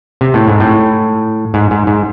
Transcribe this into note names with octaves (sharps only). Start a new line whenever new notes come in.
C3
A2
G#2
A2
G#2
G#2
G#2